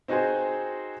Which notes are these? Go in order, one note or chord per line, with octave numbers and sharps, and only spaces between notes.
C4 D#4 F#4 G#4 C5